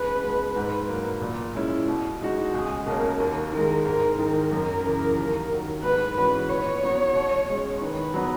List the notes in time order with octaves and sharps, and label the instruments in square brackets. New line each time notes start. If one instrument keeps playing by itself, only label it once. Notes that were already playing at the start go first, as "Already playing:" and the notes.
Already playing: [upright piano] C#2 [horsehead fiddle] B4
[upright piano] B2 G#3
G#2
F#3 A#3
A#2
G#3 C#4 E4
B2
G#3 D#4 F#4
[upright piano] C#2 [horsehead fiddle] G#4
[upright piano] B2 A#3 C#4 [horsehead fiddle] A#4
[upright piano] D#2 [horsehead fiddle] A#4
[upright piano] D#3 G#3 [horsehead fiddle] A#4
[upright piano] G#2 [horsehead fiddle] A#4
[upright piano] D#3 G#3 [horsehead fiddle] A#4
[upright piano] F#2
C#3 E3
D#2
D#3 F#3
[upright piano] G#2 [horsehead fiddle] B4
[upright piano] E3 G#3 C#4 F#4 [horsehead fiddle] B4
[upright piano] A#2 [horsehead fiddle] C#5
[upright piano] F#3 B3 F#4
B2
G#3 C#4
[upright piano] D#3 [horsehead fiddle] B4
[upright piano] F#3 B3